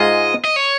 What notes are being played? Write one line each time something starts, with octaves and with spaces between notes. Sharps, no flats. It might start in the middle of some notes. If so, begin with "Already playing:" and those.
Already playing: G#2 G#3 F4 D#5
D#5
C#5